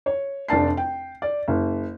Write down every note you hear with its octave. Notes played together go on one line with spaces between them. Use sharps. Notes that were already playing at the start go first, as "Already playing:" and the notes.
C#5
F1 D4 A5 C7
G5
D5
F#1